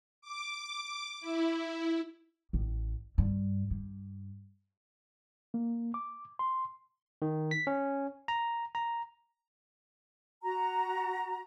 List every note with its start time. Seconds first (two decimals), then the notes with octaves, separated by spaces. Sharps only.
0.21 D6
1.20 E4
2.53 A1
3.18 G2
3.70 G2
5.54 A#3
5.94 D6
6.39 C6
7.22 D#3
7.51 B6
7.67 C#4
8.28 A#5
8.75 A#5
10.43 F#4 A#5